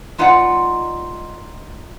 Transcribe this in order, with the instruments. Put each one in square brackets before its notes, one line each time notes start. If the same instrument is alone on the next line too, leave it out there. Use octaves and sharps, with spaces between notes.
[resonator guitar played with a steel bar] G#3 D#4 F4 B4 D5 F#5